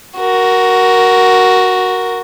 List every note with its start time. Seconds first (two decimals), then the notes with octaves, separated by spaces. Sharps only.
0.18 F#4 A#4